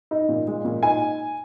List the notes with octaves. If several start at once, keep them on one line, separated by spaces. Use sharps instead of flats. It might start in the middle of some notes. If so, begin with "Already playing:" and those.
D#4
A#2
G#3
A#2
D#4 G#5